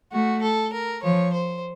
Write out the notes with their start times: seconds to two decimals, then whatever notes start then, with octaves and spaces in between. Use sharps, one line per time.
0.12 A3 F#4
0.42 A4
0.73 A#4
1.03 F3 C#5
1.33 C5